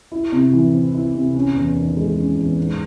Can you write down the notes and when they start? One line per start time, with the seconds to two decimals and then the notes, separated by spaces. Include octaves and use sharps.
0.12 E4
0.32 C3
0.53 E3
0.74 C4
0.94 E4
1.14 C3
1.35 C#4
1.55 E2
1.76 D#3
1.97 G#3
2.18 C#4
2.37 E2
2.58 G#2